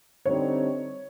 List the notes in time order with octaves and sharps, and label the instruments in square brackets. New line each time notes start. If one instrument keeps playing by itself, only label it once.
[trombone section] D3 G3 C4 D#4 [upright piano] C#5